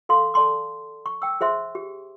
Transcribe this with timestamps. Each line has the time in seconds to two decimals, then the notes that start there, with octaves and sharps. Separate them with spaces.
0.09 A4 F5 C6
0.34 A4 D5 A5 C6 D6
1.06 C#6
1.22 G5 E6
1.41 G#4 C5 E5 C6
1.75 G4